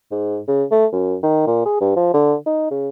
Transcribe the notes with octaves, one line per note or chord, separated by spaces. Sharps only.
G#2
C#3
A3
F#2
D#3
A#2
G#4
G2
F3
D3
D#4
C#3